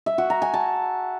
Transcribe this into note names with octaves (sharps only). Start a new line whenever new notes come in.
E5
F#4
A#5
G#5
A5